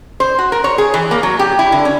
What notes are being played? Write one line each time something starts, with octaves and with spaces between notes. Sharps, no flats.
C5
F#4
A#4
C#5
G#4
E3
A#3
F#3
G4
E4
D3
C#4